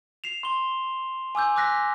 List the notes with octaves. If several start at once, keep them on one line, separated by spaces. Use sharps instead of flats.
C7 E7 F7
C6 G7
G#5 D6 E6 G6
D6 E6 F#6 A#6 B6